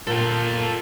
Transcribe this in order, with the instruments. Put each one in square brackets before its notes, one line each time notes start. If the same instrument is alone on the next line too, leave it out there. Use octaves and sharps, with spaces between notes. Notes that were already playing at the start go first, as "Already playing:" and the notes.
[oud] A#2 [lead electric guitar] A4 G5